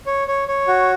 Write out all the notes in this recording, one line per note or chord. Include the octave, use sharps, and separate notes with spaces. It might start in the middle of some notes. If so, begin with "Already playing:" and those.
C#5
C#5
C#5
F#4